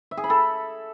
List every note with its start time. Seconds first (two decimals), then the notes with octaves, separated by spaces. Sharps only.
0.11 E5
0.17 G#4
0.24 B5
0.30 A4